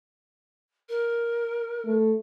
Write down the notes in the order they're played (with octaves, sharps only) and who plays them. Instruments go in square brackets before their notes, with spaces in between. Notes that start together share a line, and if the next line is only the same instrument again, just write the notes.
[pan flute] A#4
[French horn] A3